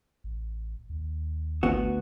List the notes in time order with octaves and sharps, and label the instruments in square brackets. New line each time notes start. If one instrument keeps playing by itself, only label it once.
[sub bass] A1
D#2
[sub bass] G#1 [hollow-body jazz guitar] D2 B3 F#4